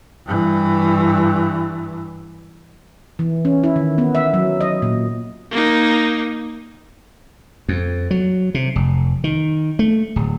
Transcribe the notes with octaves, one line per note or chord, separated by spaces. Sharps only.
G2 E3
E3
C#4
E4
D#3
B3
E5
F#3
D#5
A#2
A#3 D#4
F2
F#3
C3
F1
D#3
A3
D1